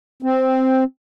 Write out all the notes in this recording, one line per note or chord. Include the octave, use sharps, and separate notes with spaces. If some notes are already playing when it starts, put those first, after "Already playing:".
C4